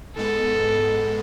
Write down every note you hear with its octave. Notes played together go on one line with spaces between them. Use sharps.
G#2 G#3 B3 A4